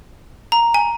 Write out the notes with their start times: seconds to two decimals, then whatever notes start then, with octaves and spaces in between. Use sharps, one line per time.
0.52 A#5
0.74 G#5